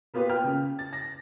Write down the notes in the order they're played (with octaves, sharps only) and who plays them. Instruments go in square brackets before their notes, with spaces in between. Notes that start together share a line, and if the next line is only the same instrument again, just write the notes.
[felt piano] A#3 B3 F4 G4 B4
G5 F6
C#3
A6
A#6